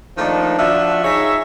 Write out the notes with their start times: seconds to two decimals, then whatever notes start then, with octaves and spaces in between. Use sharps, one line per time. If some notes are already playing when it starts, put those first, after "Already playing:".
0.18 D#3 F3 A3 A#3 D4 D#4
0.58 F3 D4 F#4 E5
1.04 D#4 G#4 C#5 E5